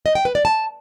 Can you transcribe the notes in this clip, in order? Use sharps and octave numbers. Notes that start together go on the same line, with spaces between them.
D#5
G5
B4
D5
A5